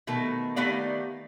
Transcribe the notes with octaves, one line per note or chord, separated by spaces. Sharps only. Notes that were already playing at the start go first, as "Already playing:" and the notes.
B2 D#3 A3
D#3 A3 B3 G4 D5 F5